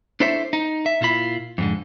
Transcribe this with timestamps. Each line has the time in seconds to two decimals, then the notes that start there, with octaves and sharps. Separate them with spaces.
0.20 D4 E4 A4 C5 C#5 E5
0.53 D#4
0.86 E5
1.01 A#2 E4 F4 B5
1.58 F2 G#2 D3